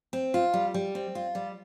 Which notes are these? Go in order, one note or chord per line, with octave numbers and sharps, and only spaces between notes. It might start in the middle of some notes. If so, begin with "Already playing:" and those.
C4
F4
G3
G3
C4
F4
G3